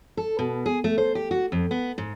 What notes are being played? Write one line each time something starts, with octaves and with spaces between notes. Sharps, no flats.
A4
B2
G#4
A3
C5
G4
F#4
F2
B3
G#2